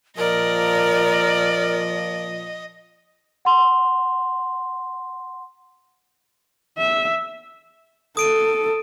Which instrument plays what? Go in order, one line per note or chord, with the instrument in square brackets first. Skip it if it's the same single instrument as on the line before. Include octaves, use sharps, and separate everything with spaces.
[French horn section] A#2 F3 [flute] A#4 [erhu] D5 [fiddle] D#5
[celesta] F#5 C6
[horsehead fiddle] E5
[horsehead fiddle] A4 [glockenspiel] D#6 D7 D#7